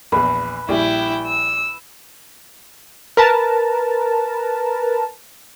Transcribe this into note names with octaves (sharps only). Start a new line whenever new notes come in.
A#1 E2 B4
A#1 G3 E4 G5
E6
A#4 B4 A5 A#5